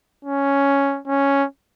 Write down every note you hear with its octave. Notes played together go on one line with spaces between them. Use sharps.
C#4
C#4